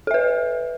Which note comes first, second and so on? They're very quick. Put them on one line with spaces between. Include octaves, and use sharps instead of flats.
A4 E5 B4